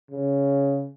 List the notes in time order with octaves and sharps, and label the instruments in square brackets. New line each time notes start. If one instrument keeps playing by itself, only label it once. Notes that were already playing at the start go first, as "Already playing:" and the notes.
[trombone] C#3